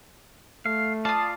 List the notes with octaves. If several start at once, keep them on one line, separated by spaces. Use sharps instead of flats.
A3 F5
F4 D5 F5 A5 D#6